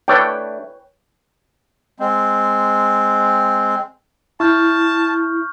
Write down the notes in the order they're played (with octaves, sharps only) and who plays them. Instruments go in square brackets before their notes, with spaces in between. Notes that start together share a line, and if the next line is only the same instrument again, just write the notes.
[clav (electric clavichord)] A3 D4 [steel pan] B4 C#5 G5
[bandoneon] G#3 C4
[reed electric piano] E4 [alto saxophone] A5 [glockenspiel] C#6 F6 G6